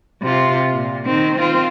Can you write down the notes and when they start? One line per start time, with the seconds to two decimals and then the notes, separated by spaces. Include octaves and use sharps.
0.22 C3 F4
0.74 A#2
1.05 D#3 C4
1.39 C4 F4